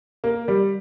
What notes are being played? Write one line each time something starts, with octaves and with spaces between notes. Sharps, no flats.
A#3
G3